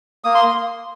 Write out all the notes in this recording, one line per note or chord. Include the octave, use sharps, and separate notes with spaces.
A#3 D#6
C6